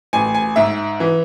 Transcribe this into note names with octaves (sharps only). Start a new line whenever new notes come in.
A1 G#5
G#5
G#2 E5
E3